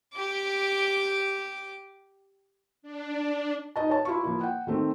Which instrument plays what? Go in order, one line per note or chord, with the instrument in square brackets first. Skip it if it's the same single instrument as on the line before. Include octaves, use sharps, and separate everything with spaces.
[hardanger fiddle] G4 D6
[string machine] D4
[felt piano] D#4 D#5 A5
C#5 A5
E4 F4 C#6
F3 A#3 E4
F#5 G5
D#3 A3 C4